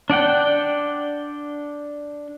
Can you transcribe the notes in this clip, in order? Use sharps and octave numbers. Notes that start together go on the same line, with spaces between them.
D4 D5 F#5 G5